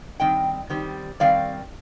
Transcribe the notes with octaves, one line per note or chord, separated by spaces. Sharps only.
D#3 G3 C4 D#5 G5
D#3 G3 C4
D#3 G3 C4 D5 F5